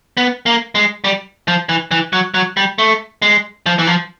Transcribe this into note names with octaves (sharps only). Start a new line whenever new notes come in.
B3
A#3
G#3
G3
F3
E3
E3
F#3
F#3
G3
A3
G#3
F3
E3
F3